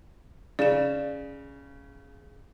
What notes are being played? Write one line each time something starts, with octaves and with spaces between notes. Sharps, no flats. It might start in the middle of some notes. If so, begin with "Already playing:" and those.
C#3 D5 E7